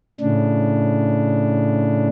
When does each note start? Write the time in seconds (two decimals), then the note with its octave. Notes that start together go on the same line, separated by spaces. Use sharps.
0.20 A2 C#3 D4